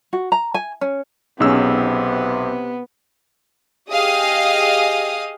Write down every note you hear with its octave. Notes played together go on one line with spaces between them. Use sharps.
F#4
A#5
G#5
C#4
B1 C3 B3 C#4 D#4 G#4 E6
G4 G#4 D#5 F5 D#6